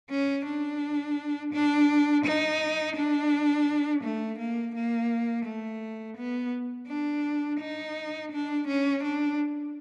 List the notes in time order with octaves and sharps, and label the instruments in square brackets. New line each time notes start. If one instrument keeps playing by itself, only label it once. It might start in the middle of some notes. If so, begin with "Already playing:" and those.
[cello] C#4
D4
D4
D#4
D4
A3
A#3
A#3
A3
B3
D4
D#4
D4
C#4
D4